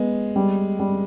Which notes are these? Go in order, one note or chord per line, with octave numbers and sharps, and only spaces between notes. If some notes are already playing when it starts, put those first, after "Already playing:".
Already playing: G#3 B3
G3
G3